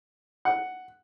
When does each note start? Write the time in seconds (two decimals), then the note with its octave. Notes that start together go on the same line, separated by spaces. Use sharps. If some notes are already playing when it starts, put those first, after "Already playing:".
0.45 F#5